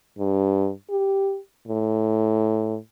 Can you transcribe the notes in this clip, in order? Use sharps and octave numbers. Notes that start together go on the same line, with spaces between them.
G2
G4
A2